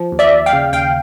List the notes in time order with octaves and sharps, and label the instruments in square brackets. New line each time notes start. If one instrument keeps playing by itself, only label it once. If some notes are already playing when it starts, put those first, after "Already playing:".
Already playing: [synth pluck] F3
D#2
D5 E5
D#2
F5 G5
C#3
D#2 F5 G5